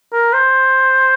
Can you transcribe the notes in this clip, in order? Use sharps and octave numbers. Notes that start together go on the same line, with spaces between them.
A#4
C5